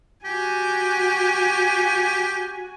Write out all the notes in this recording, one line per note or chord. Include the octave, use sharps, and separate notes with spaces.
F#4 G4 G#5